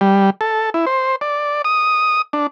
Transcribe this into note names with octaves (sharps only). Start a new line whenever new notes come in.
G3
A4
E4
C5
D5
D#6
D4